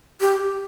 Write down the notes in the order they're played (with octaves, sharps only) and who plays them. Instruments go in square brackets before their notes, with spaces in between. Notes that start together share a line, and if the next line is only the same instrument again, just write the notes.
[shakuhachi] G4